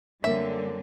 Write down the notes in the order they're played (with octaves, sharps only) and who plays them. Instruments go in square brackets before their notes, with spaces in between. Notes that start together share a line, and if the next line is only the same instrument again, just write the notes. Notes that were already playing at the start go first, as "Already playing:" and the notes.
[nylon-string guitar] F#2 A#3 [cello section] D3 G3 C4 [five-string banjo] E5